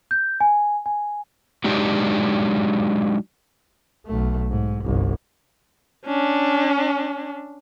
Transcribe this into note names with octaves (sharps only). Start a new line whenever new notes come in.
G6
G#5
G#5
F#3 G#3 D4 D#4 G4
B1 A3
G#2
G1 C2
C#4 D4